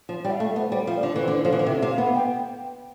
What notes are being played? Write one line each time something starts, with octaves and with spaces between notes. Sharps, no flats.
F3
G3 G5
E5
F5
A3
E5
B3
C5
G3 C5
F3
D5
D3
E3 C5
D3
F3 C5
E3
D3
C3 E5
C3
F5
B3
G5